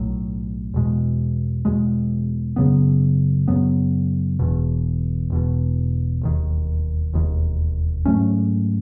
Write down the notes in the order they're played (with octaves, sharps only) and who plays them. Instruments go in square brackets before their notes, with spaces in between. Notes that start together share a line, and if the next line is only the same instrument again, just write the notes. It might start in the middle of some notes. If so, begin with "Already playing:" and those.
Already playing: [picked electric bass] B1 A2 F#3
E2 B2 G#3
E2 B2 G#3
F#2 C#3 F#3 B3
F#2 C#3 F#3 B3
E1 E2 B2
E1 E2 B2
E1 D#2 D#3
E1 D#2 D#3
G#2 F#3 A3 C#4